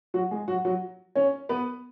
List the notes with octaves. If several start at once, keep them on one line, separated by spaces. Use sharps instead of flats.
F#3 F#4
G#3 G#4
F#3 F#4
F#3 F#4
C#4 C#5
B3 B4